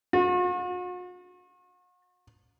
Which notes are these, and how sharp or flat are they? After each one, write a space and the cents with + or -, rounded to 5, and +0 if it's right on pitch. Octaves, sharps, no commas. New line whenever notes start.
F#4 -45